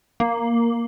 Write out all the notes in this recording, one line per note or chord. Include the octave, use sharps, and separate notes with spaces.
A#3